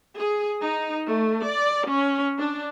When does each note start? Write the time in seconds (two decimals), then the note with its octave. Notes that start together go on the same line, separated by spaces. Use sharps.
0.18 G#4
0.62 D#4
1.05 A3
1.44 D5
1.89 C#4
2.38 D4